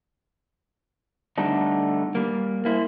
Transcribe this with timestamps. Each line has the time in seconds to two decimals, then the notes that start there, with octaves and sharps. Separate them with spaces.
1.38 D3 G3 A3 B3 D4 D#4
2.15 G3 A#3
2.65 A#3 E4 C5